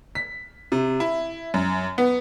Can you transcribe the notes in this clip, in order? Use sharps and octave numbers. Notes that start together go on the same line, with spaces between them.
B6
C3
E4
F#2
B3